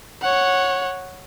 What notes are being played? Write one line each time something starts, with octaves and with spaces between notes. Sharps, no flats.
C#5 F#5